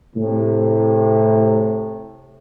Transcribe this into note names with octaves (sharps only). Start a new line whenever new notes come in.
A2 C3